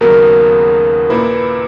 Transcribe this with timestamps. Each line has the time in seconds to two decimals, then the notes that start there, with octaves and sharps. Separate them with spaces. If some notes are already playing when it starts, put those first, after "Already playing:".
0.01 D#2 C#3 F#3 B3 A#4
1.10 A#2 A#3 E4 B4